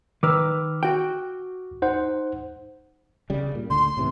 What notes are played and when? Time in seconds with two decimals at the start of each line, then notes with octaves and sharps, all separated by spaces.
0.23 D#3 B4 D6 E6 F6
0.83 F#4 G5
1.82 D#4 C5 F#5
3.30 C#3 G3
3.55 A#2
3.70 D2 D3 C6
3.97 A2 C3 E3